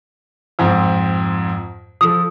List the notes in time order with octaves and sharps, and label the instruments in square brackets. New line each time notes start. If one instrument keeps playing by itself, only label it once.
[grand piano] F2 G#2 C4
[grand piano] F3 A4 [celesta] D#6